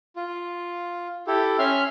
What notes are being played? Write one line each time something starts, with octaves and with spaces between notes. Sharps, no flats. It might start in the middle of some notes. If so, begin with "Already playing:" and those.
F4
E4 G4 A4
C#4 E5 C6 F6